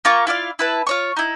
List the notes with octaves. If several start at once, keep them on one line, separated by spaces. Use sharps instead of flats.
A#3 F4 C#6
E4 F4 D5 F5
E4 B4 A5
F4 C#5 C#6
D#4 E4